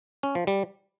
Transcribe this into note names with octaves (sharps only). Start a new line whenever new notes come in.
C#4
F3
G3